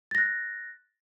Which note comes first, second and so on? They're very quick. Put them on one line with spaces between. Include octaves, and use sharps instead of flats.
A6 A#6 F#6